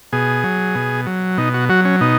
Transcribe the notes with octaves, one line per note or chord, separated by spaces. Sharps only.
B2 G#4
F#3
B2
F#3
B2 D#4
F#4
F#3 F#4
C#4
B2 D#4